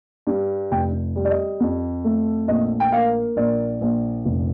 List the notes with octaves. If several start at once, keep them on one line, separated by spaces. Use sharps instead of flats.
G2
F1 G5
G3
D5
D#5
F2
A3
A#1 D#5
G5
A#3 F5
A#1 D5
A#1
F1